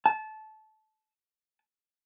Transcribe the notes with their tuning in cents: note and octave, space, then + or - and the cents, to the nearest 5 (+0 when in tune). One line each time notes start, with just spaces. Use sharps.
A5 -20